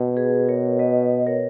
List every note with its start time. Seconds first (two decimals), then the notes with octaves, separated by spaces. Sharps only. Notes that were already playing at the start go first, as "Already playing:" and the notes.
Already playing: B2
0.17 G#4 B4
0.48 A#4 C#5
0.79 B4 D#5
1.27 A#4 C#5